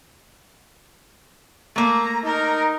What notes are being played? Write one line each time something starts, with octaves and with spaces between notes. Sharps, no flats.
A3 A#3 A#5
D#4 A#4